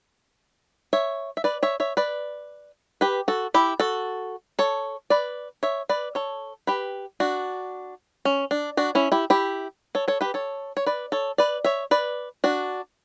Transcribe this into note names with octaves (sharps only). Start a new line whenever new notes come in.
C#5 E5
E5
B4 D5
C#5 E5
C#5 E5
B4 D5
G4 B4
F#4 A4
E4 G4
F#4 A4
A4 C#5
B4 D5
C#5 E5
B4 D5
A4 C#5
G4 B4
D4 F#4
C#4
D4
D4 F#4
C#4 E4
E4 G4
E4 G4
A4 C#5
A4 C#5
G4 B4
A4 C#5
C#5
B4 D5
A4 C#5
B4 D5
C#5 E5
B4 D5
D4 F#4